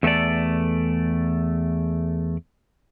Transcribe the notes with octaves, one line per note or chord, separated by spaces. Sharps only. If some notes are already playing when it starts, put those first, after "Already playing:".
E2 A3 C4 A4 D5